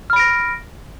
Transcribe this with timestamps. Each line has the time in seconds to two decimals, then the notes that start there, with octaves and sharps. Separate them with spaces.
0.10 F6
0.13 B5
0.16 D7
0.19 A#6